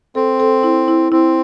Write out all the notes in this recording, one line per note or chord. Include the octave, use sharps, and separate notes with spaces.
C4 A4
A4
E4
E4
C4 E4